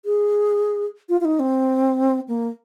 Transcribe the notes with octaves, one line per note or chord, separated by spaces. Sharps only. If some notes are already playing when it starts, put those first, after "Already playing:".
G#4
F4
F4
D#4
C4
A#3